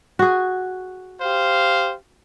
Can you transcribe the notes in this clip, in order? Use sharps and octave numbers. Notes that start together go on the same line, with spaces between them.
F#4 G#4
G4 C5 F5